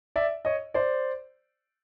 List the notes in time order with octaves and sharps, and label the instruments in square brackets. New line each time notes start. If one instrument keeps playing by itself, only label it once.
[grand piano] D5 E5
C#5 D#5
C5 D5